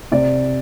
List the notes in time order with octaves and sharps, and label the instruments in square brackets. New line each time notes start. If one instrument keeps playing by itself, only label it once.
[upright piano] C3 D5